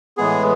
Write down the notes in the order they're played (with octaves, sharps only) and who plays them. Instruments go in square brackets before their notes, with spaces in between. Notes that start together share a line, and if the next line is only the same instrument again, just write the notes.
[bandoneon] A2 E3 G#3 B3 G#4